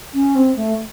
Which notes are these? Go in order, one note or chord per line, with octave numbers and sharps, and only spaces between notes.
C#4
C4
A3